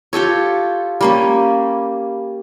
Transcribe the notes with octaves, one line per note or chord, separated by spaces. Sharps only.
F4 G4 A4 C#5
G3 A#3 C#4